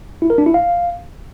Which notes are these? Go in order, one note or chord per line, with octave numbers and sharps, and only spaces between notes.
E4
A#4
D4
E4
F5